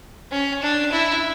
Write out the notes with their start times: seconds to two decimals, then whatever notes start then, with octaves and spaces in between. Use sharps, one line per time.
0.31 C#4
0.63 D4
0.92 E4